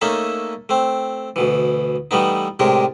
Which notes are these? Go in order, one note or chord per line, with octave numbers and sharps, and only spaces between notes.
A3 A#3 C#4 D#4 A4 E5
A3 C4
D2 B2 E3
E3 G3 A3 B3 D#4
A2 C3 G#3 D4 G4 A#4